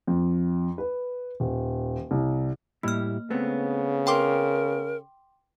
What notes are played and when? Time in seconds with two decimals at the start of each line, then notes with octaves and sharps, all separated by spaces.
0.07 F2
0.78 B4
1.40 D#1
2.11 C2
2.83 A2 G3 A#3 E4 F6
3.30 C#3 A3 B3 C4
4.07 A#4 G5 C6 D6